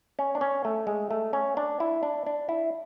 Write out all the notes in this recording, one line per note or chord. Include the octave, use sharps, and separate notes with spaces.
C#4
D4
C#4
A3
G#3
A3
C#4
D4
E4
D4
D4
E4